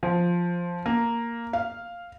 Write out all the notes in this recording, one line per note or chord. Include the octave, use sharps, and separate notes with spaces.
F3
A#3
F5